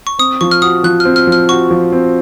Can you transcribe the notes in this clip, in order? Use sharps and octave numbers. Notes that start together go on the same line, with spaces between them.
C#6
C4 D#6
F3 C#6
F6
F#4 D#6
F3 F#6
F6
C4
F6
F3
F6
F#4 C#6
F3
C4